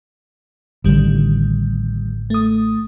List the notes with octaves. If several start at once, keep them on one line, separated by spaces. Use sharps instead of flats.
A1 A2 D3 D#3 G3
A3 D#6